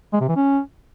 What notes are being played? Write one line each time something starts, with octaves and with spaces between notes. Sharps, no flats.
G#3
C3
E3
C#4